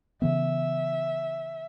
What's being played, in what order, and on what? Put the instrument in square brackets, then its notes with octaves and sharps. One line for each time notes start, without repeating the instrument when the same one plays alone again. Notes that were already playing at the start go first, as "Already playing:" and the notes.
[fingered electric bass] C#3 E3 B3 [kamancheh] E5